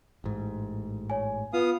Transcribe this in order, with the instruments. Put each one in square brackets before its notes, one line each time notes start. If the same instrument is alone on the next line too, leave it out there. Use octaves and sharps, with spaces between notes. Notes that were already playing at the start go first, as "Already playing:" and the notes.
[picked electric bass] A1 G#2
[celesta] C#5 G#5
[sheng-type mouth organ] B3 F5 D#6 [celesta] F4